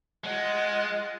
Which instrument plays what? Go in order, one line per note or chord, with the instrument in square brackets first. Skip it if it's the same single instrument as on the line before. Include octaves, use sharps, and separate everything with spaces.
[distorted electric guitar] G#3 [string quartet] F4 D#5 F#5